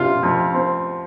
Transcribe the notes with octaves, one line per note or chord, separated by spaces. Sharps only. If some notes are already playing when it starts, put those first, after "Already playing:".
Already playing: C3 F4
F2
C4